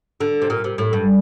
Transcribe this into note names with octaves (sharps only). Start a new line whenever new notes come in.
D3
C3
A#2
C3
A2
G2